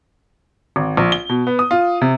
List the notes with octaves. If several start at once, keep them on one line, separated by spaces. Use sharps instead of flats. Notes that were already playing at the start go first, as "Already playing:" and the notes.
G#1
A#1
G7
B2
B3
D#6
F4
C3